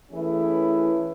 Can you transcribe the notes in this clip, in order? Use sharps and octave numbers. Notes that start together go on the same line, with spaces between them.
E3 A3 C#4 E4 G#4 B4